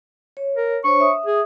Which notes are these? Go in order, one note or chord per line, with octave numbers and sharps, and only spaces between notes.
C#5
A#4
D4 C5 C#5 C#6
E5 D#6
G#4